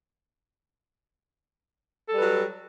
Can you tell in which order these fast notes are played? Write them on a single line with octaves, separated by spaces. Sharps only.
A4 G3 B4 F#3